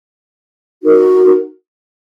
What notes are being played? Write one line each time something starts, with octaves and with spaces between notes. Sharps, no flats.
D#4 F#4 A#4